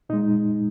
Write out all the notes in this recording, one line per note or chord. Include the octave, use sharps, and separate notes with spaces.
A#2 G#3 D#4